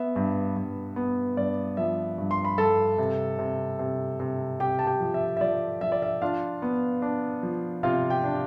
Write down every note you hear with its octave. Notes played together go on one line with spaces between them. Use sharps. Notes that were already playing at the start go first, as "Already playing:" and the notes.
Already playing: B3 E5
G2
G2
B3
G2 D5
F3 E5
G2
C6
B5
G2 A4 A5
C3
C3
C3
C3
C3 G4 G5
A5
G4 G5
F3
E5
E5
F3 D5
F3 E5
D5
E5
D4 F4 F5
B3
D4
F3
C3 F4 F5
G4 G5
D4